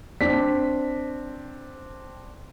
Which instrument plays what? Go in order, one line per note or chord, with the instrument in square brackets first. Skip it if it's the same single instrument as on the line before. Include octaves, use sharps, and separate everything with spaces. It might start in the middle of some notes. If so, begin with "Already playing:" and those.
[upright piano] C4 D4 B6